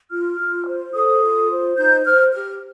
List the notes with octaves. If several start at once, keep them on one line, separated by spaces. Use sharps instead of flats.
F4 F6
F4
C5
A4 D#6
F4
C5
D#4 G6
C5 F6
G4 F6